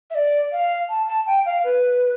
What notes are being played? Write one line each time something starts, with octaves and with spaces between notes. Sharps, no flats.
E5
D5
F5
A5
A5
G5
F5
B4